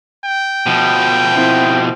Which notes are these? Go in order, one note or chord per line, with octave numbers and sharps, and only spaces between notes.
G5
B2 F3
C4 E4